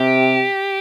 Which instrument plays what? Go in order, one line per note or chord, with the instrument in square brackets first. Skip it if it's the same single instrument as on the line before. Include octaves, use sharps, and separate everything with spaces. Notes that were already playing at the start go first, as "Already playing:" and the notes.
Already playing: [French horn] C3 [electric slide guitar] G4